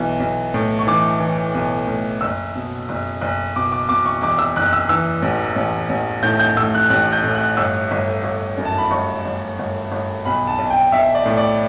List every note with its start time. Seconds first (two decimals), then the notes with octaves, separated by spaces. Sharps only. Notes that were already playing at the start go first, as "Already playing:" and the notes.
Already playing: B1 E3
0.20 B1
0.54 A2
0.79 C#6
0.87 E3 D6
1.20 E3
1.54 B1
1.87 A2
2.21 F#1 E6
2.55 B2
2.89 F#1
3.21 F#1
3.56 B2 D6
3.72 D6
3.89 B2 D6
4.06 C#6
4.22 E2 D6
4.39 E6
4.56 F#1 F#6
4.73 E6
4.89 E3 E6
5.22 A1
5.56 A1
5.89 A1
6.23 A2 G6
6.39 G6
6.57 A2 E6
6.74 F#6
6.90 A1 F#6
7.12 G6
7.24 A2
7.35 F#6
7.57 G1 E6
7.91 G1
8.24 G1
8.57 F#2
8.65 A5
8.78 B5
8.91 G1 C#6
9.25 G1
9.59 G1
9.92 G1
10.25 B1 B5
10.47 A5
10.59 B1
10.70 G5
10.92 B1 E5
11.15 D5
11.26 A2
11.37 D5